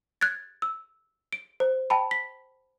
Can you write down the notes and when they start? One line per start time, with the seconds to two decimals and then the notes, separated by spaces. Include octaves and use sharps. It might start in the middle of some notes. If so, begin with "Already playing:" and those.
0.21 F#6 G#6 A6
0.62 E6
1.33 D7
1.60 C5
1.90 G5 A5 B5
2.11 B6